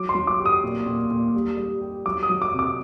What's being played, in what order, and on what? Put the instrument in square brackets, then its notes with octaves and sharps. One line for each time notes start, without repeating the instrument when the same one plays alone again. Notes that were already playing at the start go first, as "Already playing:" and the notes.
Already playing: [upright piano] F#3 [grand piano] D6
[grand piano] C6
[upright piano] F#3
[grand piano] D6
[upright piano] G4
[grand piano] D#6
[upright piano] A#2
A#2
A#2
G3
G3
G4
[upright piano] F#3 [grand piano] D6
[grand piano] D#6
[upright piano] F#3
[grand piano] D6
[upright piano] C3
[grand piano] D6